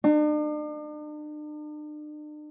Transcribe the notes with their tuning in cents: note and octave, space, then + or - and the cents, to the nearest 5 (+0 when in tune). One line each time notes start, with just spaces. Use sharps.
D4 +45